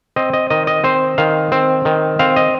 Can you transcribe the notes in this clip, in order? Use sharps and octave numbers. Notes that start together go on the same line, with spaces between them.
C4 D#5
D#5
D#3 D#5
D#5
C4 C5
D#3 F5
C4
D#3
C4 F5
D#5